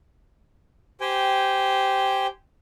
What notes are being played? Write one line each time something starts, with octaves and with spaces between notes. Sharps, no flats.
G4 C5 G5 G#5